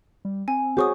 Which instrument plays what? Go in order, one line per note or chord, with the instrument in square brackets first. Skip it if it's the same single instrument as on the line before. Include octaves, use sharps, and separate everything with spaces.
[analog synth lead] G3
[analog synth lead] C4 [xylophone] G#5
[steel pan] F#4 G#4 C#5 [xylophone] C5 C#6 D#6